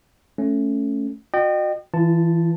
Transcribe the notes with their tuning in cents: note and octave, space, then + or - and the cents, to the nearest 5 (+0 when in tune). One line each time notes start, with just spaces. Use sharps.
A3 +0 C#4 +0
F#4 -35 D#5 -40 G5 -15
E3 +0 F4 -45 A5 +0